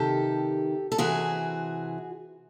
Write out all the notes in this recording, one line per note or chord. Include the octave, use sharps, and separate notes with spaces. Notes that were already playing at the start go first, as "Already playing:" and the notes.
Already playing: C3 D#3 G4 A4
A4
C3 E3 F#4 G#4